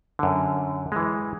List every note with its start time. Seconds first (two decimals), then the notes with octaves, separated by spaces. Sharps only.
0.19 F#2 D3
0.92 E3 G#3